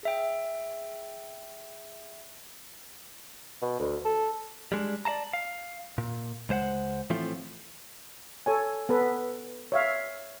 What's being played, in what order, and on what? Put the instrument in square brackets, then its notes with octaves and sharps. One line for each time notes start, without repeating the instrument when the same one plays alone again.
[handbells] G#4 E5 G5
[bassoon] B2
D2
A4
[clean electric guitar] G3 G#3 D4
D5 F5 A5 A#5
F5
A#2
C#2 G#3 C5 F5 F#5
A2 E3 F3 A3 C4 F4
[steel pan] A4 C#5 G#5
B3 A4 B4
C#5 E5 F5